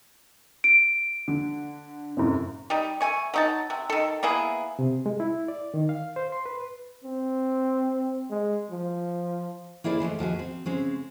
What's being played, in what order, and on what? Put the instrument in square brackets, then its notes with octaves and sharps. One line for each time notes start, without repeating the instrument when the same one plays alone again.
[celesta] D7
[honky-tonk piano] D3
F#2 A2 C3
[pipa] G3 D#4
A3 G#5 C#6
F#3 D#4 A5
C3
D#3 A4
A#3 B3 E4 G#4
[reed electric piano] C3
G#3
E4
D5
D#3
F5
C5
C6
B4
[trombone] C4
G#3
F3
[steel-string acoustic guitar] A#3 E4 G#4 C5 D5
E3 F3 G#3 A3
D#2 F3 F#4 G#4
C4
C#3 G#3 C4